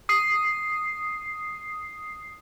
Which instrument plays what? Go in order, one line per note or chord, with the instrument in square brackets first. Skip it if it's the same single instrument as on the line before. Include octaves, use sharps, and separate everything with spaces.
[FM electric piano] D#6 C7